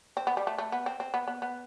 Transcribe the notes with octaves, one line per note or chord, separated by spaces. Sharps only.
C4
B3
G3
A3
A3
B3
C4
C4
B3
B3
B3